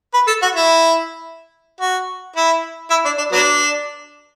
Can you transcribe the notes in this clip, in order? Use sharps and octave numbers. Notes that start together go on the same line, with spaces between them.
B4
A4
F#4
E4
F#4
E4
E4
D4
D4
F#3 B3 D4